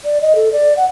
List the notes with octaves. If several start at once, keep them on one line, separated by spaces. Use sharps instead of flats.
D5
D#5
A4
D5
F#5